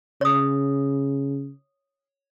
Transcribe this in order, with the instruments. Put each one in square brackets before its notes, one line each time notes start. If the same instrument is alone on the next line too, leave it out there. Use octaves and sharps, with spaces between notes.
[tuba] C#3 [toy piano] C#5 D#6